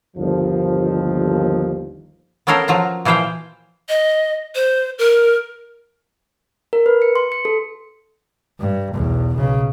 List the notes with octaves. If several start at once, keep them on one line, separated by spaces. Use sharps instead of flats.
G1 D#2 F3
B3 C#4 A4 A#4 F5 G5
F3 F#3 F4 A#5
A#2 E3 F3 C5 F5 G5
D#5
C5
A#4
A#4
B4
C#7
C6
C#7
A4
G2
B1 E2
B1 C#3